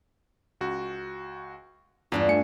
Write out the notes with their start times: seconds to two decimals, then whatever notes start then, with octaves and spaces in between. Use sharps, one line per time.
0.61 C#2 F#4
2.12 E2 G2 D4 F4
2.28 A3 G#5 C#7